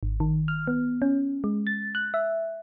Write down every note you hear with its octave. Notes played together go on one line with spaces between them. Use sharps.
G#1
D#3
F6
B3
C#4
G#3
A6
F#6
E5